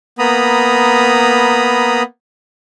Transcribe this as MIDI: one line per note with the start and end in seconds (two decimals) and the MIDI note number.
0.19 2.03 58
0.19 2.03 59
0.19 2.03 82
0.19 2.03 83
0.19 2.03 87